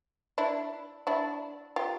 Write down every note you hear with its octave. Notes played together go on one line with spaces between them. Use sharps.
D4 E4
D4 E4
F4 G4